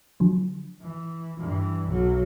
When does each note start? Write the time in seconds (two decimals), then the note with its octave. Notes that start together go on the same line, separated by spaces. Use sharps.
0.20 D3 F3 F#3
0.82 E3
1.39 G2 E3
1.89 B1 F#3